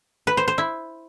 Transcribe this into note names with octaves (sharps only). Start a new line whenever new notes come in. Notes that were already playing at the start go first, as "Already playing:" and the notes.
B4
C5
C5
E4